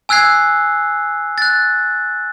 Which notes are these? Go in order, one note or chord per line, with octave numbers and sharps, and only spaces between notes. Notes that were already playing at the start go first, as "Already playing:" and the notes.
G#5 E6 F#6 G#6 C7
F#6 A6